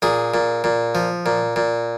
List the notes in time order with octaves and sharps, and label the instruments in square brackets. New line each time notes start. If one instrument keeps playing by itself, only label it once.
[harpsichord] A#2 G#4
A#2
A#2
F3
A#2
A#2